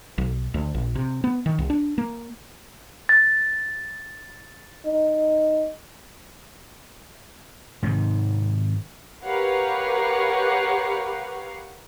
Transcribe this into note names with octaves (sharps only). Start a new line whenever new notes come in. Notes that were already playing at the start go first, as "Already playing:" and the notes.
B1
D2
A#1
C3
B3
D#3
C2
D4
A#3
A6
D#4
G#2 C3 D#3
G4 A#4 B4 C#5 F5 F#5